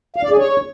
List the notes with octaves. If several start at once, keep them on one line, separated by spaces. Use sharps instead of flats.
F5
D5
G#4
C#5